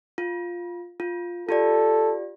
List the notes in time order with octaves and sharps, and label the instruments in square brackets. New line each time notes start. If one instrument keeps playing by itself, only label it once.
[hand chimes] F4
F4
[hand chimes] F4 G4 D5 [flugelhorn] A4